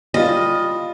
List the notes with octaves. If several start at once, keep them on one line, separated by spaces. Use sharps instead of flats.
G3 F4 D#5